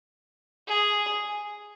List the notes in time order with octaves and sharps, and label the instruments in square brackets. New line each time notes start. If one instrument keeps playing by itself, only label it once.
[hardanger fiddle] G#4